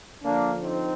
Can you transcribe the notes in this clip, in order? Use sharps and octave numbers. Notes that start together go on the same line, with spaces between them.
D3 F3 A#3 D4
C4 D#4